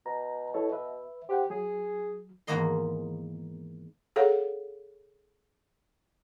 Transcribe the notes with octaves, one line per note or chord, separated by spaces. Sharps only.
B2 A#5
E4 A4 C#5
B4 E5
G4 C5 F#5 G5
F#3 G#4
E2 G#2 D#3 A#3 D#5 C6
G#4 A4 C#5 F5 F#5